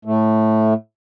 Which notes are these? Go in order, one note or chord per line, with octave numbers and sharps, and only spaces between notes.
A2 A3